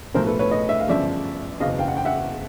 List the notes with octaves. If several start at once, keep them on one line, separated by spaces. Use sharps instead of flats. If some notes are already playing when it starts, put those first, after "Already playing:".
B1 A2 F3 A#4 C5
A4 B4
B4 C#5
C#5 D#5
E5
F5
G1 F#2 C#3 F3 D5 E5
F#1 E2 B2 D#5 F5
F5 G5
F#5
G5
E5 F#5